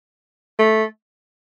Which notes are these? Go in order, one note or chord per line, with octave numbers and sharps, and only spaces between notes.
A3